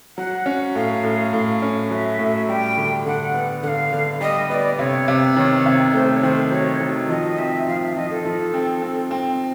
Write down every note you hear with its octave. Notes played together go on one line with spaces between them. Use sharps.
F#3 F#5
C#4
A2 F5
A2
A2
C#4
F#3 E5
E5
A2
E5
G3 G5
D3
D3 F#5
B3
D3 F5 F#5
D3
G3 D#5
B3 D5 D#5
C3 C#5
C3
D#3 C#5
C3
A3 C5
C#5
D#3 C5
F#3 C#5
D#3
F3 D#5
D#5
C4 E5
F3 F5
E5
F3 D#5
A4
F3
C4
C4
C4